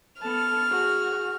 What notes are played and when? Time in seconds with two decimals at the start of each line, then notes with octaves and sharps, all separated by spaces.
0.22 B3 A4 A5 F6
0.70 F#4 G#4